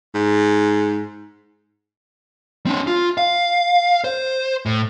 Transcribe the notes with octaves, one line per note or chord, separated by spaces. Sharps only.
G#2
C4 D4
F4
F5
C5
A2